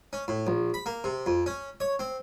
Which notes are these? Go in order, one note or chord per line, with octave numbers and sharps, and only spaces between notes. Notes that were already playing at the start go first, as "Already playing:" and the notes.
C#4
A2
A#1
B5
A#3
C3
F2
C#4
C#5
C4